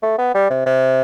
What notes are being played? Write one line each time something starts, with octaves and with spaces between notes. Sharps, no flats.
A3
B3
G3
C3
C3